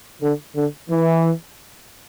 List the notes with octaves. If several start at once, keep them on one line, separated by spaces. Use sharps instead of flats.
D3
D3
E3